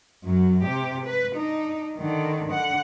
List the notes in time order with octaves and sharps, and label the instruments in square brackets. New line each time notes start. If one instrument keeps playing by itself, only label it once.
[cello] F#2 F#3
C3 G4
B4
D4 D#4
D3 D#3
D3 F#5